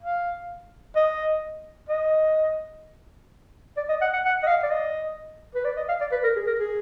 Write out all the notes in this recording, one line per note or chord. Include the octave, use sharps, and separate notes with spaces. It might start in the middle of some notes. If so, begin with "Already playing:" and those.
F5
D#5
D#5
D5
D#5
F#5
F#5
F#5
D#5
F5
D5
D#5
B4
D5
D#5
F5
D5
B4
A#4
G#4
A#4
G#4